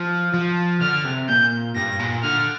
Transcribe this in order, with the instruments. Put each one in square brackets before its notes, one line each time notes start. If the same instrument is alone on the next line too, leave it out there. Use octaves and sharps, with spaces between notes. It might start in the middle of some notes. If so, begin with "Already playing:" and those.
Already playing: [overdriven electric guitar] F3
F3
[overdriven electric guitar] D3 [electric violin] F6
[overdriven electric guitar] C3
[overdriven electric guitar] A#2 [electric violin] G6
[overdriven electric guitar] G2 [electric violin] A#6
[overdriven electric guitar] A#2
[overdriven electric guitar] D3 [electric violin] F6